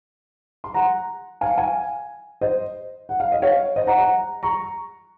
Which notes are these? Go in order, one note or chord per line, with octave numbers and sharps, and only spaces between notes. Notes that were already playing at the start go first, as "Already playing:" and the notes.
C6
F#5 A#5
F5 G#5
F5 G#5
C5 D#5
F#5
F5
D#5
C#5 F5
C5 D#5
F#5 A#5
F#5 A#5
A#5 C#6